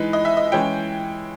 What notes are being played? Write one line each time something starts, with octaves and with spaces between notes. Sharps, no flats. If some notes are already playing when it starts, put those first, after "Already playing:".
Already playing: E3 G#3 D#4 B4
D#5
E5
D#5
E3 G#3 C#4 E4 G5